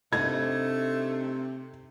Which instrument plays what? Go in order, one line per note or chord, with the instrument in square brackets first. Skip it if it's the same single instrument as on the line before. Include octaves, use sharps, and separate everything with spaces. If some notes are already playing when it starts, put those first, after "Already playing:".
[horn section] C3 [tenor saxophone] A3 [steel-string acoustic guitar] D4 D#4 D#5 [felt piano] G#6